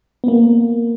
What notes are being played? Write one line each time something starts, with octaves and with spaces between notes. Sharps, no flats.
B3
A#3